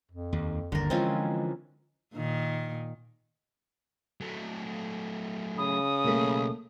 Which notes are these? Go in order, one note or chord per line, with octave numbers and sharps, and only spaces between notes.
F2
D#2
G1 D#2 D3 A#4
D3 E3 F3 G#3 C4 C#4 F4
A#2 D#3
F#3 A3
C#3 B5 D#6
B1 A3 A#3 B5